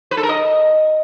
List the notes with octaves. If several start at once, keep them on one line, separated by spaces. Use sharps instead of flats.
B4
A4
A#4
D#5